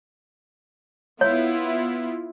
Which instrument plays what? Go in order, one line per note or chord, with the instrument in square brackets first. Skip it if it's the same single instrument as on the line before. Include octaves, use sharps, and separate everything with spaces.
[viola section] B3 E4 F4 [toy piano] C#5